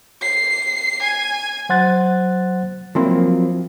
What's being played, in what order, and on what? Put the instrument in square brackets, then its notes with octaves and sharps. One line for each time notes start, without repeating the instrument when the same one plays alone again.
[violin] C7
G#5
[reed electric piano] F#3 C5 F#5 C6 F#6 A6
[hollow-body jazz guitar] F3 F#3 A#3 C4 E4